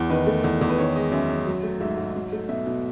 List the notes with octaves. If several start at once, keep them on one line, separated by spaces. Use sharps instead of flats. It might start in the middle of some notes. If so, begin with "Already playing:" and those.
Already playing: E2
D#3 B4
A3
E2
E2
B4
D#3 C#5
G#3 D#5
F#2 E5
F#2
F#3
A3
G#2 E5
G#2
F#3
A3
B2 E5
B2